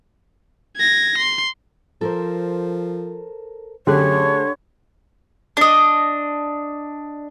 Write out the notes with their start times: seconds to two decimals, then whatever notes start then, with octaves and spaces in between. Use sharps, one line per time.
0.77 G#6 A#6
1.18 C6
2.01 F3 A4 A#4 C5
3.87 F#2 D3 A3 G4 G#4 C#5 F#6
5.57 D4 D#5